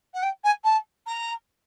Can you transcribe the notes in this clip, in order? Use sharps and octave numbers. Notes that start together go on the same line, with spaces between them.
F#5
G5
G#5
A5
A#5